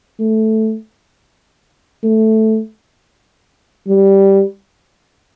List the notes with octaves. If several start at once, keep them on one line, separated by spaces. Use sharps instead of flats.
A3
A3
G3